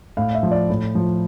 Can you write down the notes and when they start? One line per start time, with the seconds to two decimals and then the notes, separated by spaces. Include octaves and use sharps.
0.17 A2 F5
0.35 E5
0.43 F3
0.51 D5
0.70 A2
0.95 F3